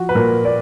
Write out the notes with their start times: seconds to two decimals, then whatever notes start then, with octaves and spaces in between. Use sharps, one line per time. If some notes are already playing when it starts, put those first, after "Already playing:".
Already playing: F3 F#4
0.09 B4
0.15 A#2 A#4
0.45 D5